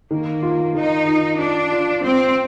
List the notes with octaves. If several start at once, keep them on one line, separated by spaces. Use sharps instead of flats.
D#3 A#3
F4
D#3 D#4
F4
D4 F4
F4
C4 F4